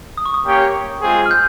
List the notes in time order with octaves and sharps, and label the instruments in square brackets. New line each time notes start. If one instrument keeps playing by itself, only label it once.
[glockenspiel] D#6
C#6
D#6
[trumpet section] A#3 C#4 G4 C#5 G5
G#3 C4 F4 G#4
[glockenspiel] F6
G6